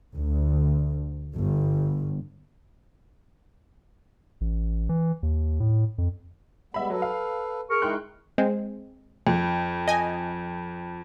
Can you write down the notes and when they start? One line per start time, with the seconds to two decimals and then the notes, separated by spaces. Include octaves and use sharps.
0.15 D2
1.35 G1
4.41 A1
4.89 E3
5.23 D#2
5.60 A2
5.98 F2
6.74 G3 G#3 B3 E5 B5
6.90 F#3 A4 B4
7.02 F5
7.70 G#4 A#4 C#6
7.82 G#3 D#4 E4 G5 C6 F#6
8.38 G#3 C4
9.27 F2
9.88 D#5 G#5